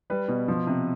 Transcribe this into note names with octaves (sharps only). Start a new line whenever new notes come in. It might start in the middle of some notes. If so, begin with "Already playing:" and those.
G3 B4
B2
F3
C3